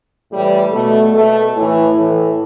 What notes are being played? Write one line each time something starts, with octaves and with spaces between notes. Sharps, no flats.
A2 E3 G3
B2 A3
B2 A3
A2 E3
A2 E3